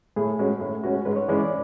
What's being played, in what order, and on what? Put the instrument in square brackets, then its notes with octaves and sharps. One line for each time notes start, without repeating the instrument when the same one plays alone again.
[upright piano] A2 [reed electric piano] G#4
[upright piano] G#3 C#4 F#4
A2
G#3 C#4 F#4
[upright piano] G#2 [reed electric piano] B4
[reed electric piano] C#5
[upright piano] E3 G#3 C#4 [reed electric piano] D5
[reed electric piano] D5